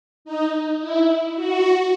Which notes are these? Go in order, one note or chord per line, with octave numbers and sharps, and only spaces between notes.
D#4
E4
F#4